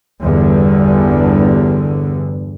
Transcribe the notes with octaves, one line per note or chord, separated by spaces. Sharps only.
G1 E2 G2 D3